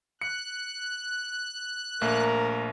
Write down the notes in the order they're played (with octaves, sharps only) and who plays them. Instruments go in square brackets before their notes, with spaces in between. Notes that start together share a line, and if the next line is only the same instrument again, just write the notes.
[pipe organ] F#6 [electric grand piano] C#7
[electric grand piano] A#1 A3 A#3 [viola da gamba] A#4